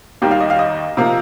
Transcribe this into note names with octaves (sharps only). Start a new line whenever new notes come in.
D#2 D#3 G3 A#3 G4
F5
D#5
F5
D#5
C3 F3 A#3